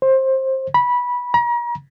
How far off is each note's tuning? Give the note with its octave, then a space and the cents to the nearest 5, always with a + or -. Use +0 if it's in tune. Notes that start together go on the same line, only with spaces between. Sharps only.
C5 +20
B5 -15
A#5 +40